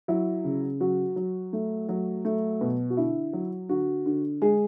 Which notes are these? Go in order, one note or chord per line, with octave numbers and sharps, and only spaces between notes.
F#3 E4
C#3
F#3 F#4
F#3
A3
F#3
A3
B2
F#4
D3 E4
F#3
D3 F#4
D3
G#3 G#4